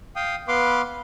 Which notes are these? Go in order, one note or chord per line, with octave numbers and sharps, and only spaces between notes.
F5 G5 D#6
B3 B4 F5 C6 D6